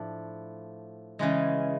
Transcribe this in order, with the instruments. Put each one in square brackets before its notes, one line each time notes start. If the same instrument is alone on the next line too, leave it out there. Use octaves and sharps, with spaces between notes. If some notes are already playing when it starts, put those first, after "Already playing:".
Already playing: [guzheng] A2 F3 D4
C#3 E3 G#3